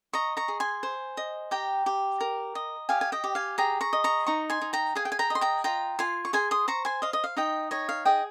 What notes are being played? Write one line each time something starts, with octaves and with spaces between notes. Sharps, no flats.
D#5 A#5 C#6
A#5 C#6
G#4
G#5 C6
C5
D#5
G4 G5 A#5
G4
A#4
D#5
G4 F5 G#5
G#5
D#5 G5
G4
F5 G#5
G#4 G5 A#5
A#5 C#6
D#5
A#5 C#6
D#4 A#5 C#6
G#5 C6
D#4
G5 A#5
G#4 F5 G#5
G5
G#5
G5 A#5
D#5
C6
G5 A#5
F4 G5 A#5
F4 G#5 C6
C#6
G#4 G#5 C6
C6 D#6
C5 A#5 C#6
G#5 C6
D#5 F5
D#5
F5
D#4 D#5 G5
C#5 D#5
F5
G#4 D#5 G5